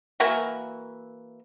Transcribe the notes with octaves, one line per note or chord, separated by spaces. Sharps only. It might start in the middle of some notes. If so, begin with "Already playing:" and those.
E3 A#3 F#4 E5